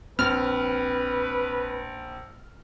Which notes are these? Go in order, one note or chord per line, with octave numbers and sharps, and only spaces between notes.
A#1 C4 B4 F6